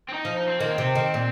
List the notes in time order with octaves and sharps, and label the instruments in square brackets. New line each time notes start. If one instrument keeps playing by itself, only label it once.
[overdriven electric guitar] C4
D#4
[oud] F3
[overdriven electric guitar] D#4
C4
[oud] D#3 [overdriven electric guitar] A#3
[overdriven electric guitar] C4
[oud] C3
D#3
A#2